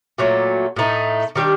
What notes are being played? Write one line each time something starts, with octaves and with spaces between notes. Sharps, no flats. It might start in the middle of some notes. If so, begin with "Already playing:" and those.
A#2 F#3 A3
A2 A3 D#4
D#3 G3 D4 G4